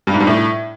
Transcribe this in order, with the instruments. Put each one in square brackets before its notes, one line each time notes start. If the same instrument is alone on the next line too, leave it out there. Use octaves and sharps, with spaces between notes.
[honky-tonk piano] G2
G#2
G2
A2